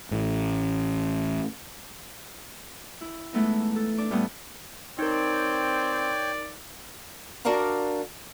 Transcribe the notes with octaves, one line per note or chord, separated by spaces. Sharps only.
A1 A2
E4
E3 G#3 A3 B3 D#4
A4
D4 D6
A2 G3 A3 B3 D#6
C4 D#4 A#4 C#5 D5 G5
D4 F#4 A#4 D5 F5 A#5